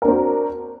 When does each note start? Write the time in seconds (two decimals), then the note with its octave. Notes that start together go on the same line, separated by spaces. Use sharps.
0.02 A#4
0.05 D4
0.08 C4
0.11 F#4